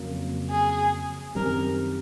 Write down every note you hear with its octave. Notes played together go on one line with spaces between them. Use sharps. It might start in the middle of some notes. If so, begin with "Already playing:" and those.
Already playing: F2 C#3 F#3 A#3
G#4
F#2 D#3 G3 C4 A#4